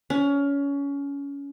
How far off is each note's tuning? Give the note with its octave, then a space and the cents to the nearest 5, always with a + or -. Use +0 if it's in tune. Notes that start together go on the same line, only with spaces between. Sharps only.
C#4 +25